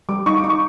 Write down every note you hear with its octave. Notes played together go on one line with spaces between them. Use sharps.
G3 D6
D#4 C#6
D6
D#4
C#6